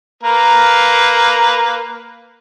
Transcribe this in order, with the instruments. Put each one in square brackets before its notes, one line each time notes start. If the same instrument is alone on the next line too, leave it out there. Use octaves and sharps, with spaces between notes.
[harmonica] A#3 A#4 B4